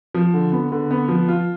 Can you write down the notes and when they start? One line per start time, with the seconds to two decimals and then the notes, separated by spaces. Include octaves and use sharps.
0.14 F3
0.34 D3
0.52 B3
0.72 D3
0.91 B3
1.08 F3
1.28 F4